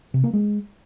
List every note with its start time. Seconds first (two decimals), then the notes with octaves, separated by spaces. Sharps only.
0.14 C3
0.24 A#3
0.33 G#3